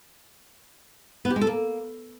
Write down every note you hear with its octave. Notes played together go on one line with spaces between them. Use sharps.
B3
G4
G#3
A4
A#3